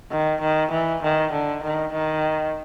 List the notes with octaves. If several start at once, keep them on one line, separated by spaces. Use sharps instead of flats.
D#3
D#3
E3
D#3
D3
D#3
D#3